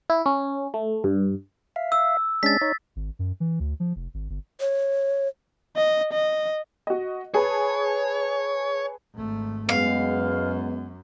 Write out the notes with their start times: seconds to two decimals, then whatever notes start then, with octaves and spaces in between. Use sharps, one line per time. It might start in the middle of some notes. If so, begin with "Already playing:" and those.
0.10 E4
0.26 C#4
0.74 A3
1.04 G2
1.76 E5 F5
1.92 E6
2.43 G#3 C#4 D4 A6 B6
2.61 D#4 C#5
2.96 G#1
3.19 F#2
3.40 E3
3.60 D2
3.80 F3
3.96 F1
4.14 G#1
4.30 G1
4.60 C#5
5.76 D#5
6.13 D#5
6.87 F#4 D#5
7.34 G#4 B4 C#5 A5
9.14 G#1 A3
9.69 F#2 G#3 B3 F5